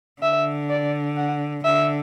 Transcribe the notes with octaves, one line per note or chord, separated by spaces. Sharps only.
D3 E5
D5
F#5
D3 E5